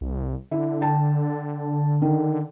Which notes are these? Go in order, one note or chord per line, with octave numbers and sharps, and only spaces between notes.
C2
D3 E4
G5 A5
D#3